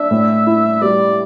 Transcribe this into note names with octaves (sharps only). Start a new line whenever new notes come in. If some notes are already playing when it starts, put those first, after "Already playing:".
Already playing: D4 E5
A2
E4
G3 D5